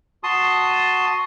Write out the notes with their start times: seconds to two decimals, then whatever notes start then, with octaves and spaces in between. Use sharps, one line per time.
0.23 F#4 A5 C6 D#6